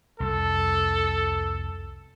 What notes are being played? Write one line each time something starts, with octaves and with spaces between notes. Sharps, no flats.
C2 F2 A4